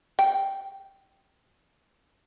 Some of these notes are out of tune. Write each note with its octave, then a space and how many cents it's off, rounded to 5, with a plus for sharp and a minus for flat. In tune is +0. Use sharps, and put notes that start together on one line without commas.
G5 +0